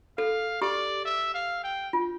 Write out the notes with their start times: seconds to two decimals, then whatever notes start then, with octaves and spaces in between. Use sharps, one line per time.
0.18 A4 F5
0.62 G4 D5
1.05 E5
1.34 F5
1.64 G5
1.93 F4